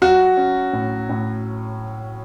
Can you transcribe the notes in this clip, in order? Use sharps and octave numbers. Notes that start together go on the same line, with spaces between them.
F#3 F#4
C#4
A2
A2